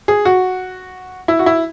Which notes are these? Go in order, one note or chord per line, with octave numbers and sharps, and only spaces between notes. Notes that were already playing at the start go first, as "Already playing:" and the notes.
G#4
F#4
E4
F#4
E4